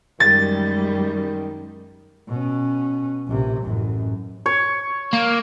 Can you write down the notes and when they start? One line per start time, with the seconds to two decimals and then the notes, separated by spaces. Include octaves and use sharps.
0.20 F#2 D#3 G3 G#3 A6
2.28 B2 C#4
3.27 A#1 C3
3.63 A1 F#2
4.46 C#5
5.13 A#3